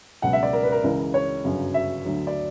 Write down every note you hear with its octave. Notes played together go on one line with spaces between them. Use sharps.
C#2 B2 F#3 F#5
E5
D5
A#4
B4
A#4
C#2 C#3 E3
C#5
G1 F#2 C#3 F#3
E5
D2 D3 F#3
D5